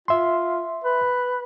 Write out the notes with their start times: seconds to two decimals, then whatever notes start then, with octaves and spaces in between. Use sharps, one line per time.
0.08 F4 E5 C6
0.84 B4